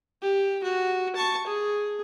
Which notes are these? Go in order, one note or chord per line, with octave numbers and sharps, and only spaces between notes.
G4
F#4
A5 C#6
G#4